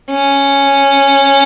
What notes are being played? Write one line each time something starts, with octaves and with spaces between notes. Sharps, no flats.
C#4